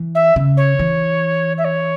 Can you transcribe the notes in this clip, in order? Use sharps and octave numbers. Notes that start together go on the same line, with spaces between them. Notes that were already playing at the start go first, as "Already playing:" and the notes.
Already playing: E3
E5
C#3
C#5
E3
E5
C#5